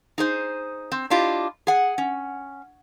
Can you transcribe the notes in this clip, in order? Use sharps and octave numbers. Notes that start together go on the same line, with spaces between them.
D#4 G#4 C5
C4
D4 E4 F4 G4 D#5
G#4 F#5
C#4